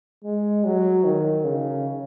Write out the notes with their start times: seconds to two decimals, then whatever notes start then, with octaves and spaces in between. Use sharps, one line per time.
0.24 G#3
0.65 F#3
1.04 D#3
1.45 C#3